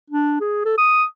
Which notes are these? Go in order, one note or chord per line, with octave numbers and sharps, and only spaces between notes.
D4
G#4
A4
D#6